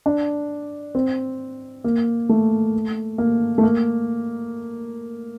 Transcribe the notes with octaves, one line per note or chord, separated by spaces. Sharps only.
D4
C4
A#3
A3
A#3
A3
A#3